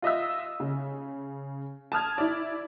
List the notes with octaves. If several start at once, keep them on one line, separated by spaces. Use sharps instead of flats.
F4 D#5 E5 E6
C#3
A5 D#6 F6 G#6
E4 D5